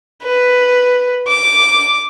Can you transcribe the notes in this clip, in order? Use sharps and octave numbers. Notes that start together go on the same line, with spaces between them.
B4
D6